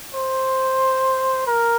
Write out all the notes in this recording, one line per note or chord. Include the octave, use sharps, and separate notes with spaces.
C5
A#4